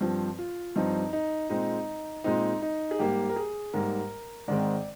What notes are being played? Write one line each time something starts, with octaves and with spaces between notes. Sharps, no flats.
G2 F3 C4
F4
G2 F3 C4 D#4
D#4
A#2 G#3 C4 D#4
A#2 G#3 C4 D#4
D#4
G#4
G#2 G3 A#3 G4
A#4
G#4
G#2 G3 A#3 A#4
G#2 D#3 G#3 C4 D5